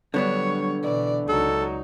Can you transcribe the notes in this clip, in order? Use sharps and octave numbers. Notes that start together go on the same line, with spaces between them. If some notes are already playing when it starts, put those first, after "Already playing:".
D3 F#3 G3 B3 D4 C#5
B2 E3 D5
C#2 F#3 D#4 A4